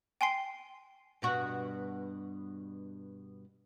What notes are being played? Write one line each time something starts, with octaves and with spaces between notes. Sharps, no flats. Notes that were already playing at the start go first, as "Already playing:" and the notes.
G5 G#5 C6 C7
G2 B2 F#4